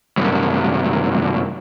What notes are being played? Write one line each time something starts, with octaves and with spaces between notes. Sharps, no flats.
C2 F#2